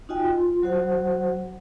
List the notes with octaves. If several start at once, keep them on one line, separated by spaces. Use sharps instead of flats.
D#4 F4 F#4 D#5 G5 G#5
F4
F#3 F#4 C5 F#5